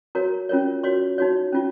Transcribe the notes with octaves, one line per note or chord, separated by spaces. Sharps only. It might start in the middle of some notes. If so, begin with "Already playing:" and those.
F#4 A#4 C#5 A#5
C#4 F4 A#4 C#5
F#4 C#5 C6
D#4 F#4 C#5
C#4 F4